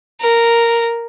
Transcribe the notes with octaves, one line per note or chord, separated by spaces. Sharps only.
A#4